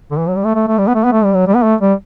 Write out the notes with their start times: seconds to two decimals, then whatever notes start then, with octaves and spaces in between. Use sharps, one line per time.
0.11 D3
0.18 E3
0.28 F#3
0.36 G3
0.44 A3
0.55 A3
0.68 A3
0.78 G3
0.88 B3
0.95 A3
1.04 B3
1.13 A3
1.24 G3
1.35 F#3
1.47 G3
1.55 B3
1.63 A3
1.81 G3